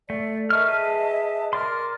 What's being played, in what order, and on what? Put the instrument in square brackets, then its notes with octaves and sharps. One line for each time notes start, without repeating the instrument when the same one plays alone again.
[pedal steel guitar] A3 [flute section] D5
[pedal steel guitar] A#4 C#6 F6 [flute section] D#5 E5 A5
[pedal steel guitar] G#4 B4
[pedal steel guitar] A#4 D5 C6 [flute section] F6